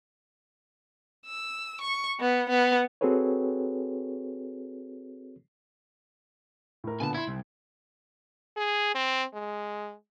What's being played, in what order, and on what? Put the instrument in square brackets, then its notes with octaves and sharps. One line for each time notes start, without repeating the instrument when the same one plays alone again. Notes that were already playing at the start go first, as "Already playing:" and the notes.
[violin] E6
C#6
B3
B3
[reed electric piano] C4 F#4 G#4 A4 B4 C#5
[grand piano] A2 A#4
[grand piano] A#2 D3 B3 [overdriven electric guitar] G#5 A5
[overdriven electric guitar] E4 [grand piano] C6 G#6
[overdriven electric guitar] C2
[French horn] G#4
C4
G#3